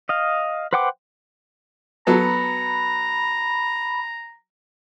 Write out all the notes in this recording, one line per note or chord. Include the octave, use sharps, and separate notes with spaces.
D#5 F5
B4 C5 F#5 G5 D6
F#3 B3 A4 A#5 B5